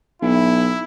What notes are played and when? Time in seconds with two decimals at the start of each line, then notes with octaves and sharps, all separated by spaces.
0.22 B1 E4